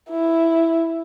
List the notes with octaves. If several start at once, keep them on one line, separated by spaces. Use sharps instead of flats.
E4